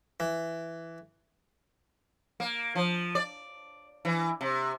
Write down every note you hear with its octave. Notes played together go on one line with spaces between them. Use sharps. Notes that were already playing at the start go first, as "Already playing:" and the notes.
E3
A#3
F3
D5
E3
C3